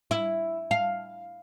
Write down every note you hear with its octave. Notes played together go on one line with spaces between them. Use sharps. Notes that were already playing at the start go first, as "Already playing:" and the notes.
E4
F5